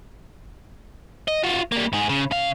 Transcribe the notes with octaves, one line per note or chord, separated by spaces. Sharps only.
D#5
F4 F#4
G3 A#3
G#2 G#4
C#3
C#3 F5